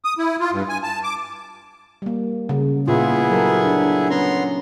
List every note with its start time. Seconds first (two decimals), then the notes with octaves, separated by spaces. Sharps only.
0.05 D#6
0.18 E4
0.40 F4
0.52 G2
0.69 G#5
0.83 A5
1.03 D6
2.02 G3 A#3
2.49 C#3
2.88 A#2 B3 E4 F4 G#4
3.30 F#3 A4 A#4
3.65 D4
4.10 B3 C#4 A#5 C6